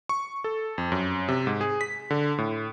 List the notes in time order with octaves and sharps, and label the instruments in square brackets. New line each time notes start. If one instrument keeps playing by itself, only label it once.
[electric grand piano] C#6
A4
F2
F#2
C3
G#2
G#4
B6
D3
A2